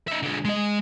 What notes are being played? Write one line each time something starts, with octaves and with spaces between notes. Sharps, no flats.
D#4 E5
D3 G#3
G#3 D#5